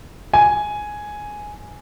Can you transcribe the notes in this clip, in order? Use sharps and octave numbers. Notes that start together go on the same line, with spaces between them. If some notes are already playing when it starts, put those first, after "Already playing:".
G#5